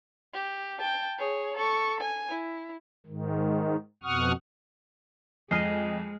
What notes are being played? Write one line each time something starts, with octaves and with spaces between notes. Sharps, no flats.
G4
G5 A5
G#4 C#5
A4 C#6
G#5
E4
G#2 D#3
F2 B2 F#5 C#6 D#6 F6
F2 G#3 D#5 G#5 F6 C7 D#7